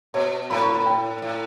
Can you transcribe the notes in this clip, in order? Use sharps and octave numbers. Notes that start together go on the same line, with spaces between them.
B2 C#5
A2 B5
C#6
B5
G5
A2